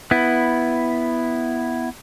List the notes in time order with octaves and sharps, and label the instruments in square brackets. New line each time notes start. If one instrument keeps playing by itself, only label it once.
[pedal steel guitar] B3 E4